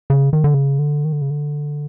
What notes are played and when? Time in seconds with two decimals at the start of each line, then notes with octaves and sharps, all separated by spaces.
0.10 C#3
0.33 D#3
0.44 D3
0.54 C#3
0.79 D3
1.05 D#3
1.13 D3
1.21 C#3
1.30 D3